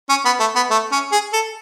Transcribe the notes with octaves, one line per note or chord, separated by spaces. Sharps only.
C#4
B3
A3
B3
A3
C#4
G#4
A4